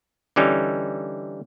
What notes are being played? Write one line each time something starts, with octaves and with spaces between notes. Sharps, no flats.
D3 E3 G3 C#4 D#4